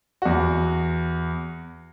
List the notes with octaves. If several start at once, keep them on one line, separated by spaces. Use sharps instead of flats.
E2 F#4